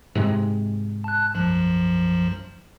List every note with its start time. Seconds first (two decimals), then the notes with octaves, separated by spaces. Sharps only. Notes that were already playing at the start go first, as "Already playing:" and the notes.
0.15 G#2 C3 G#3
1.04 A5 F#6
1.35 B1 F#2 F3